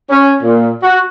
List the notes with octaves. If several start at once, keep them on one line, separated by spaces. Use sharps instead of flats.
C#4
A#2
F#4